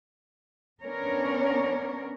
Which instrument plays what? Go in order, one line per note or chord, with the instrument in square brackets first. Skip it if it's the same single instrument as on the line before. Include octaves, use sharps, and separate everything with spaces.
[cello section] B3 C#4 D4 A#4 C#5